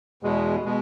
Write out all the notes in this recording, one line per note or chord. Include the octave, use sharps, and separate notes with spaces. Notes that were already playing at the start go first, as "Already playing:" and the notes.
E2 B2 G#3
B2 G#3